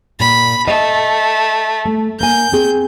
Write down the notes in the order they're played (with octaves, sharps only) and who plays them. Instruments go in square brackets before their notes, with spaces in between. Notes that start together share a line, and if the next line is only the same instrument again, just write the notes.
[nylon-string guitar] A#2 [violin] B5
[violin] A3 [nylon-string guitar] D#5
[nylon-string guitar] A3
[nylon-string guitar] A#3 G#5 [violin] G6
[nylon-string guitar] C4 G#4